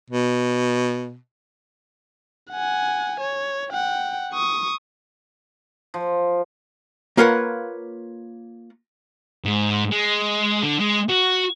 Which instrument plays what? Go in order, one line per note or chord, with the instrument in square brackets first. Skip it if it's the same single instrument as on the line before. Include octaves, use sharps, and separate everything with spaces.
[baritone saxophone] B2
[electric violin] F#5 G#5
C#5
F#5 G5
C#6 D#6
[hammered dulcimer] F3
[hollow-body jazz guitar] A#3 F4 A#4 B4 C#5 F#5
[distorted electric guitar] G#2
G#3
D3
G#3
F#4